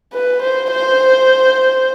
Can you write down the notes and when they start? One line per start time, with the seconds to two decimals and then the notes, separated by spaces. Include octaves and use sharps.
0.13 B4
0.42 C5
0.70 C5